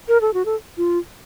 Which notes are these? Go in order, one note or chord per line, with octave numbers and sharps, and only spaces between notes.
A#4
A4
F#4
A4
F4